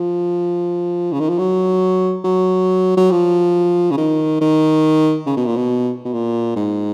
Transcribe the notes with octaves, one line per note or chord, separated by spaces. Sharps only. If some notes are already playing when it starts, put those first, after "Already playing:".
Already playing: F3
C#3
D#3
F3
F#3
F#3
F#3
F3
C#3
D#3
D#3
C#3
B2
A#2
B2
B2
A#2
G#2